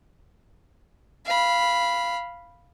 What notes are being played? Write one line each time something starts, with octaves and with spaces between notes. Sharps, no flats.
F5 B5